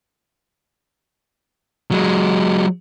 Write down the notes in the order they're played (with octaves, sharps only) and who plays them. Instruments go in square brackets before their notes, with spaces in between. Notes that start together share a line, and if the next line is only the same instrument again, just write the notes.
[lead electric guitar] F#3 G#3